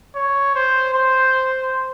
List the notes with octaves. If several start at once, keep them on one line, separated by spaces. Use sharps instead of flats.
C#5
C5
C5